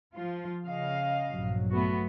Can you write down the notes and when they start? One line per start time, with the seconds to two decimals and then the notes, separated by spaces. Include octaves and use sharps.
0.15 F3 F4
0.64 C#3 D#5 F5
1.31 A#1 G2 F#3
1.71 A3 B3 F#4